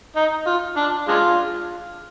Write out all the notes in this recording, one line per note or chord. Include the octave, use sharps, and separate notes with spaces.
D#4
F4
D4
G#3 D4 F4